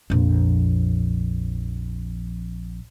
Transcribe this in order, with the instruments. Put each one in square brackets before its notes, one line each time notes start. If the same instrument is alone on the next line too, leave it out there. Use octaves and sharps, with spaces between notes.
[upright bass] A#1 F2